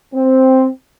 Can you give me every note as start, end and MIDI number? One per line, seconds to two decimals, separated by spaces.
0.14 0.67 60